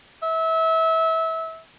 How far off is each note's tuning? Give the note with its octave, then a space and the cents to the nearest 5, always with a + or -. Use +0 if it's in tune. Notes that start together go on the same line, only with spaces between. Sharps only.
E5 -25